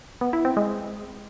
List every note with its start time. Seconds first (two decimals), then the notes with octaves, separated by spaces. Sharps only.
0.21 B3
0.33 E4
0.45 C4
0.57 G#3